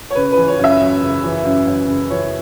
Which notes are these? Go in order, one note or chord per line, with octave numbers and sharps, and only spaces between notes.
C#5
C#3 B4
E3 B4
C#5
F#2 E5
F#2
C#3
E3
F#2
F#2
C#3
E3 C#5